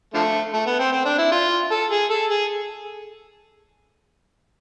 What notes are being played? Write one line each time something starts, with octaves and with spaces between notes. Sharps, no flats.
D3 F3 A3
A3
B3
C4
C4
D4
E4
F4
A4
G#4
A4
G#4